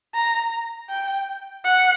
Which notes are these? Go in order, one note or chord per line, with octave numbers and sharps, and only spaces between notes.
A#5
G5
F#5